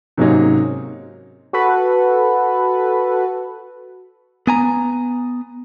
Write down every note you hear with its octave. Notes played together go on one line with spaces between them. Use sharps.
G#2 C3 F#3 A#3 C#4 D#4
F#4 A4 B4
B3 G#5 A#5